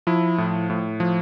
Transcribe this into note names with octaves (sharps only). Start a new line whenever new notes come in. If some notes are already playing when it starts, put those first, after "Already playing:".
F3 E4
A2
A2
F3